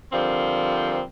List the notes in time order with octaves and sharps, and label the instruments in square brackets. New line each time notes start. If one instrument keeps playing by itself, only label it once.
[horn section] D3 F3 G3 C4 A#4